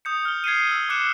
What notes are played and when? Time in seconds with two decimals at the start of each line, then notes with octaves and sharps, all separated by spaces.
0.05 D#6 G6 C#7
0.25 F6 G7
0.44 G#6 C7 C#7 D#7
0.67 E6 G7
0.89 D6 F6 F#6 C#7 E7